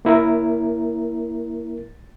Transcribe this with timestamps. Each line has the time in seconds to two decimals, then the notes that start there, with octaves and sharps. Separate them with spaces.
0.05 A#3 E4 A#4